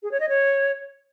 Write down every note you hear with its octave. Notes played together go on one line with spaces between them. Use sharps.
G#4
C#5
D#5
C#5